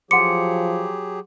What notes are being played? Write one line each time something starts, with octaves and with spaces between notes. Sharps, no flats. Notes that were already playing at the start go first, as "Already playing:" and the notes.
F3 F#3 G4 G#4 F#5 C6 D6 C#7